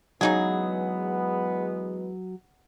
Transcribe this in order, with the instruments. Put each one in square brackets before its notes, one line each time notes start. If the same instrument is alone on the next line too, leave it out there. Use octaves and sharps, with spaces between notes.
[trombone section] E2 G#3 B3 [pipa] C#3 D#4 G#4 [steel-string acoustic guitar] F#3